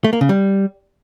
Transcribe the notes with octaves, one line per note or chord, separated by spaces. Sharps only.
A3
A#3
C#3
G3